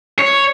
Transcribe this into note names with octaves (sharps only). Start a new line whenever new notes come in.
C#5